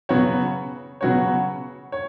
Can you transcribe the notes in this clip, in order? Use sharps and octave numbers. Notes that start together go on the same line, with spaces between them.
C#3 F#3 B3 F#4 C#5
C#3 F#3 B3 F#4 C#5
C#5